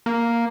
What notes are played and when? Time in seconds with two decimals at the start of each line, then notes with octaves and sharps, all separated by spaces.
0.06 A#3